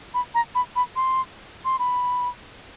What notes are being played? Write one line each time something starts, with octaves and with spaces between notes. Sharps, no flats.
B5
A#5
B5
B5
C6
C6
B5